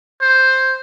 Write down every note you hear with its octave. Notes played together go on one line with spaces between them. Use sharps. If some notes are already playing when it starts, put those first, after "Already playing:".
C5